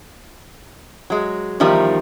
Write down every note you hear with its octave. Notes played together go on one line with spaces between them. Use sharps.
F#3 G#3
E2 D#3 F3 G3 D#4